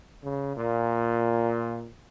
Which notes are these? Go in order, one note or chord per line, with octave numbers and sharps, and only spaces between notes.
C#3
A#2